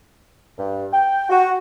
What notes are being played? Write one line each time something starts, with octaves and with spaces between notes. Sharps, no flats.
G2
G5
F#4